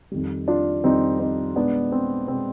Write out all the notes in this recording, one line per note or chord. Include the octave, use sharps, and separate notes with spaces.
F2 D#3 G3
D4 F4
F2 D#3 G3 C4 D#4
C4 D#4
B2 G#3 B3 D4
C4
B2 G#3 C4